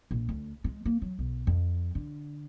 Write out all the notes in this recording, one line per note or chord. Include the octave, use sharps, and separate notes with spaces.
A#1
D2
G#3
A#3
F#3
B1
F2
D3